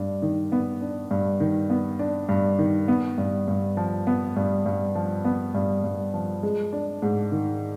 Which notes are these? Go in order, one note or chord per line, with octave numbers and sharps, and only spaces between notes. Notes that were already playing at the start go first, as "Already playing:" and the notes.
Already playing: G2 D4
D#3
B3
D4
G2
D#3
B3
D4
G2
D#3
B3
G2
G2
F3
B3
G2
G2
F3
B3
G2
G2
F3
G#3
D4
G#2
D#3